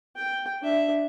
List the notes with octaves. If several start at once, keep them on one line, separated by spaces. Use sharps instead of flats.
G5
D4 E5